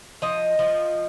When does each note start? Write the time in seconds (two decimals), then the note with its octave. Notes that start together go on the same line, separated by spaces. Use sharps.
0.22 F3 D#5
0.59 F3